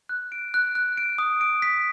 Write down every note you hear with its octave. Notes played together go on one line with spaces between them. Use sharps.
F#6
D7
F#6
F#6
D7
D#6
D7
B6